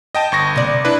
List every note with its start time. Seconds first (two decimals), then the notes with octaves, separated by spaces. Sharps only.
0.15 D#5 G5 A5
0.32 G1 C#6 A#6
0.56 C3 D5
0.85 D4 E4 B4